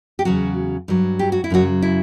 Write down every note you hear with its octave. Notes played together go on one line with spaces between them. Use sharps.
G4
E2 C#3 F#3 F#4
G2 F#3
G4
F#4
E4
F#2 C#3 F#3 F#4
E4